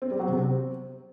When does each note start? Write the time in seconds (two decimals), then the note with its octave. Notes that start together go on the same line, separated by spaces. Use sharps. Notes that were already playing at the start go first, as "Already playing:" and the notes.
0.02 C4
0.11 G3
0.19 F#3
0.28 C3
0.37 C4